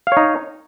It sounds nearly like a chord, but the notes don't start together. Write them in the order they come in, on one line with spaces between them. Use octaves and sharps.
F5 C#5 D#4